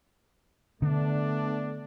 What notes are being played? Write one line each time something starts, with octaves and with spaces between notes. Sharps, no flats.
D3 A3 B3 D4